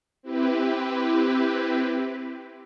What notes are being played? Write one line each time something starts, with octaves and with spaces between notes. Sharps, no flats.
C4 E4 G4 B4